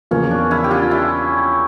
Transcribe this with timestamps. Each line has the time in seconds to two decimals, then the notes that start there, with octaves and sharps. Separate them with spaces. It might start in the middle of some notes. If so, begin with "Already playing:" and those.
0.11 E2 C#3 F3 A#3 C#4
0.31 D4
0.51 C#4 E4
0.64 G4
0.71 D4 F4
0.91 C#4 E4